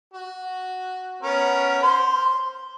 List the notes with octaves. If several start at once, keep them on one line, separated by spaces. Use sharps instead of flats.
F#4
B3 C#4 A#4
C5 C6